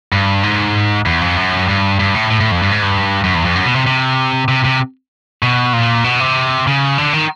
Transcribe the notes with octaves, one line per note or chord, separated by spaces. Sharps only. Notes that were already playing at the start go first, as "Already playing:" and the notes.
G2
G#2
E2
F2
F#2
G2
G2
A2
A2
A2
F2
G2
G#2
G2
F#2
E2
F2
F#2
B2
C3
C3
C3
C3
B2
A#2
B2
C3
C#3
D3
D#3